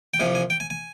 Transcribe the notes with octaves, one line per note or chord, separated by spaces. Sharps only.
G5
C2 C3 F3 G#5
G#5
G5
G#5
G#5